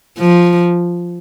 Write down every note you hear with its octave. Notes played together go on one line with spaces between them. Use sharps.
F3